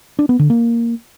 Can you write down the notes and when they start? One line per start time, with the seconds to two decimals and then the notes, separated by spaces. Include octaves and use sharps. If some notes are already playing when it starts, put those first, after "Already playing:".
0.19 D4
0.29 B3
0.39 D3
0.50 A#3